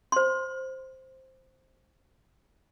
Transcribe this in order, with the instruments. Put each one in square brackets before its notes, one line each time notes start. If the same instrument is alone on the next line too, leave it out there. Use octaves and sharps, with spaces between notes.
[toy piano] C5 C6